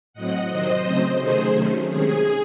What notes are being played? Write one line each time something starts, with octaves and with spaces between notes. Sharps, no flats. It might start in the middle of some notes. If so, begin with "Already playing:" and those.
A2 F#3 C4 D#5 F#5
C3 D#3 F#3 C4 C5 D#5
C#3 F#3 A3 C4
C3 D#3 F#3 A3 C#4 G#4 C5
C3 D#3 F#3 A3 C#4
C3 D#3 G#3 C#4 G#4